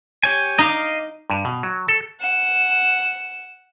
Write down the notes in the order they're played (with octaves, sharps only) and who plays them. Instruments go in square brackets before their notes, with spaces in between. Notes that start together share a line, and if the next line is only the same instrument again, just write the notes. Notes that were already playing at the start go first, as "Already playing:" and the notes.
[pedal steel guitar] G4 C#5 G#5
[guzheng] D#4 [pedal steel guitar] D#5 F5 D6
[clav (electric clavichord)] G2
B2
F#3
A4
[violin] F#5 E7